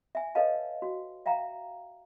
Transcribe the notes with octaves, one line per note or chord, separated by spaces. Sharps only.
E5 G#5
A4 B4 C#5 D#5 F5 A5
F#4
E5 F5 G5 A#5